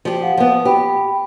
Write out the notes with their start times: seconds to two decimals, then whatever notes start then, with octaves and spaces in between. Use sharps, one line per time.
0.05 F3 G4
0.22 F5 F#5
0.37 F3 B3
0.65 G4 G5 B5